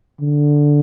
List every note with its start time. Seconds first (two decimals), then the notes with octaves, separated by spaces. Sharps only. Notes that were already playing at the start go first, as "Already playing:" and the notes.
0.21 D3